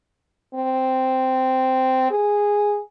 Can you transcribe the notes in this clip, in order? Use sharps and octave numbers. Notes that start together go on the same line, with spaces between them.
C4
G#4